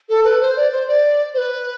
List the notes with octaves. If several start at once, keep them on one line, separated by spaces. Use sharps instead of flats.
A4
B4
C5
D5
C5
D5
C5
B4